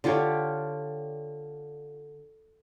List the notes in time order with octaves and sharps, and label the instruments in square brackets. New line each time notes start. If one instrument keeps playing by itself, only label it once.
[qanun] D3 F4 G4 C#5